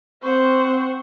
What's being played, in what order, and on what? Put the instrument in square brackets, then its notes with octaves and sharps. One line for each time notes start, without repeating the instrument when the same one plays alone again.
[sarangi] C4 [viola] C5 F#5 [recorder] C#6